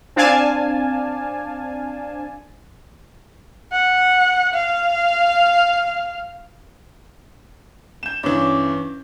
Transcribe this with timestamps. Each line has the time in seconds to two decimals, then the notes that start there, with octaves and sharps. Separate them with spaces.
0.16 C4 D4 D5 F5 G#5 A5
3.73 F#5
4.54 F5
8.03 G6 E7
8.23 G2 E3 C#4 C#5 D6